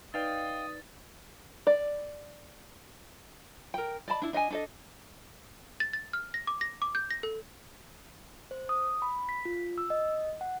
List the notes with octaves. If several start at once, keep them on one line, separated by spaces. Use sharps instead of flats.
D#4 B4 D5 D#5 F5 G5 D#6 A6
D5
A#4 G5
D5 D#5 A5 B5
D4 E4
D4 D#5 E5 G#5
D4 A4 D#5
A6
A6
F6
A#6
D6
A#6
D6
G6
A#6
A4
C5
D#6
B5
B6
F4
E6
D#5
F#5